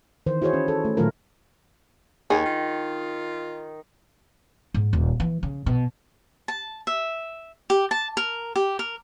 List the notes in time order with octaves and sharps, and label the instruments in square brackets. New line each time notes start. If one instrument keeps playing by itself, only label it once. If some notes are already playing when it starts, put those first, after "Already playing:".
[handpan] D#3 E3 C5
E4 F#4 G#4 C5 C#5
C#4
A4
A3
A#2 D#3 F#3 A3 F4 A#4
[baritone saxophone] D#2 [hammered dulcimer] D#3 [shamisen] G#4
[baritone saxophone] F4
[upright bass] G#2
D#1
E3
C#3
B2
[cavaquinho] A5
E5
G4
A5
A#4
G4
A#4